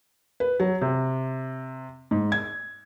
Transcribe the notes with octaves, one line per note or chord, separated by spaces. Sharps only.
B4
F#3
C3
G#2
G#6